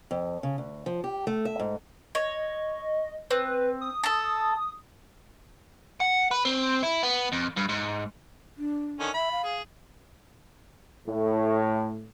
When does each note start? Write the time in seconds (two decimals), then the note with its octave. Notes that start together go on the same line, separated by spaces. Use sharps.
0.11 F2
0.43 C#3
0.58 D2
0.86 F3
1.04 G4
1.27 A3
1.45 E5
1.59 G#2
2.15 C#5 D#5
3.31 C4 B4
3.81 D#6
4.03 A4 A5
6.00 F#5
6.31 B4
6.45 C4
6.83 E4
7.03 B3
7.33 F2
7.57 G2
7.69 G#2
8.58 D4
9.00 D3 D#3 C#4
9.14 E5 B5
9.32 F5
9.44 G#4
11.07 A2